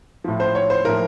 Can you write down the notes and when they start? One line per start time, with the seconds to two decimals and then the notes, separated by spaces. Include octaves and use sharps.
0.24 A2 F3
0.40 C5
0.55 C#5
0.70 C5
0.85 A2 F3 A#4